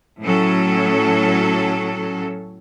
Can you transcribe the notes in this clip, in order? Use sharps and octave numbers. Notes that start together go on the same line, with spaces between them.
A2 F#3 C#4 A4